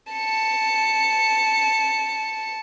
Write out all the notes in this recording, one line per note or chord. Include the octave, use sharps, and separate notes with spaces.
A5 C#7